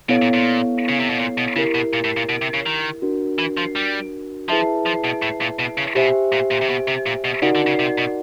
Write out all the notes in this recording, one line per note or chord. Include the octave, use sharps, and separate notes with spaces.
B2 B3 E4 A4 C#5 F5
A#2
A#2
C#3
C3
B2
A#2
B2
C#3 E4 G4 A#4
B2
A#2
A2
A#2
B2
C3
C#3
D#3
D4 F#4 A#4
E3
F3
G3
F3 E4 G#4 B4 E5 A5
F3
B2
A2
A#2
B2
C#3
B2 G4 C5 E5 G#5
A#2
A#2
C3
B2
C3
A#2
B2
C#3 D#4 F#4 A#4 D5 F#5
D3
C#3
C3
B2